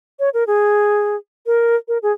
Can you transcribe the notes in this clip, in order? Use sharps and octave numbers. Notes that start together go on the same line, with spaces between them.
C#5
A#4
G#4
A#4
A#4
G#4